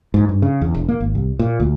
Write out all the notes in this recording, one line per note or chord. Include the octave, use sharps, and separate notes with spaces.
G#2
G2
C#3
E2
E1
A#3
G#1
C2
A#2
D2